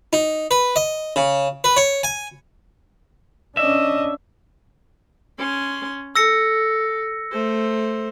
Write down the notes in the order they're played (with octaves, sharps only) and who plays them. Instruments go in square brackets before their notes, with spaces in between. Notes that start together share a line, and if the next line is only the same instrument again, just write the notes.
[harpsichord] D#4
B4
D#5
C#3
B4
C#5
G#5
[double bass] C#4 D4 [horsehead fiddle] D#5 [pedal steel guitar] E5
[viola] C#4 C6
[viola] A4 [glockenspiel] E6 A#6 C#7
[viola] A3 C5